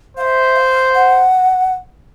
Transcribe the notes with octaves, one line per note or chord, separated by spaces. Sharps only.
C5 E5 F5
F5
F#5